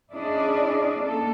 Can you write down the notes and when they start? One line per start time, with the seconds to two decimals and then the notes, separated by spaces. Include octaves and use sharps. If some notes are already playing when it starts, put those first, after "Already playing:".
0.12 C#4 D4 E4 G#4 D5 D#5
1.01 A#3 A4